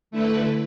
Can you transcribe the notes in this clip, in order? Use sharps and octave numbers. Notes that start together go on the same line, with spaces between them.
D3 A3 E4 B4